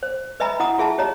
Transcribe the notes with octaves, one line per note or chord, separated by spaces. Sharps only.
C5
B4 D#5 E5 G#5 A#5 B5
E4 F#5 A#5 D#6
F4 G#4 E5 A5
G4 C#5 D#5 A#5